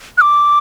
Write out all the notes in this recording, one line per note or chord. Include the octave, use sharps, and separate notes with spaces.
F#6
D6